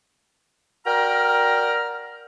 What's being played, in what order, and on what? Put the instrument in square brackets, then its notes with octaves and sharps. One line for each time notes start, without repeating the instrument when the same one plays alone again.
[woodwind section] F#4 A#4 D5 G5 A#5 F6